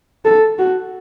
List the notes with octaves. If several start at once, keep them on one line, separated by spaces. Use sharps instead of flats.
A4
F#4